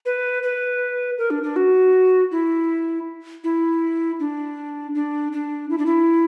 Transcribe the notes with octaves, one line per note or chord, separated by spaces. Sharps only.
B4
B4
A#4
D4
D4
F#4
E4
E4
D4
D4
D4
E4
D4
E4